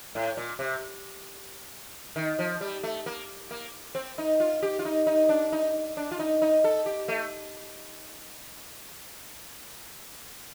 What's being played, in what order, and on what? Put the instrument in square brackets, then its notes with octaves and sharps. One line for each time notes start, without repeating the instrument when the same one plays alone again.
[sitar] A2
A#2
C3
D#3
F3
G3
A3
A#3
A#3
C4
D#4
F4
G4
F4
D#4
D#4
D4
D#4
D4
F4
D#4
D#4
A4
G4
A3